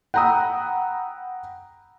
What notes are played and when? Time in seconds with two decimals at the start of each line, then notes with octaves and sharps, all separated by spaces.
0.14 F#5 G5 A#5 B5 D#6 E6